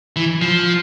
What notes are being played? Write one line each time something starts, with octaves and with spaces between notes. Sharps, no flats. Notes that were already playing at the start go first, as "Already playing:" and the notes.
E3
F3